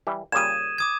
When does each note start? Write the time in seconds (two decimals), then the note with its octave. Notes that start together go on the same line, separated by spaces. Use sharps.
0.07 E3 G3
0.32 A#2 C#3 G3 D#6 G#6 D#7 E7
0.78 D6 D#6 G#6